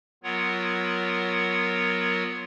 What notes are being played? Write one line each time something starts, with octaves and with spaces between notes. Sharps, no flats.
F#3 B3 F4 A#4 C#5 F#5